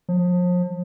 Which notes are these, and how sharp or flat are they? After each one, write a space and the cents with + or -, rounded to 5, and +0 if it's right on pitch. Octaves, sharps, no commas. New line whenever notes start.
F3 +35